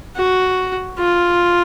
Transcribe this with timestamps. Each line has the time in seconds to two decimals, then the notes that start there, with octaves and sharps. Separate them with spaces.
0.16 F#4
0.98 F4